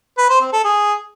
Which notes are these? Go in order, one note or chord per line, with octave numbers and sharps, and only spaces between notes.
B4
C5
C4
A4
G#4